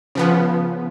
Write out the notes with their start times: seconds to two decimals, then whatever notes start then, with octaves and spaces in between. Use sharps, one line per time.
0.15 C#3 F3 B3